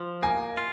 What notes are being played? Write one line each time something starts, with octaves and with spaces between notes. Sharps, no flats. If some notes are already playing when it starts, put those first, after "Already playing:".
Already playing: F3
A#3 G#5
F4